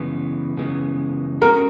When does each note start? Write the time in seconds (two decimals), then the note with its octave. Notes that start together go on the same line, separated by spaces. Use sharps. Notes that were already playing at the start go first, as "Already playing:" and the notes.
Already playing: F#2 C#3 E3 G#3 B3
0.57 F#2 C#3 E3 G#3 B3
1.41 G#3 C#4 F#4 A4 A#4